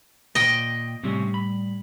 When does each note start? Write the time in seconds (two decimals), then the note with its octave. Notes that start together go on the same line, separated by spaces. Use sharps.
0.35 A#2 D#5 G5
1.04 A2 C3 G3 C4 C#4
1.34 B5